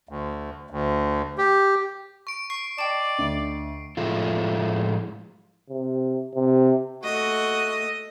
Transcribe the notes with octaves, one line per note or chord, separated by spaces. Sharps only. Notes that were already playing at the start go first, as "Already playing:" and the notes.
D2
D2
G4
C#6 D7
C#6 C7
D5 D#5 G5 A5
D2
A2 F3 G#3 A3 F4
C3
C3
A3 F#4 D#5